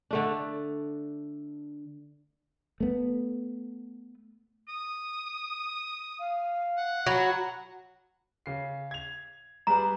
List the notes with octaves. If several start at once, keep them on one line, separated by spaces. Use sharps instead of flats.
D3 A3 D4
A3 B3
D#6
F5
F#5
F#3 F#4 B5
C#3 C7
G#6 F7
G3 G#4 B4 A#5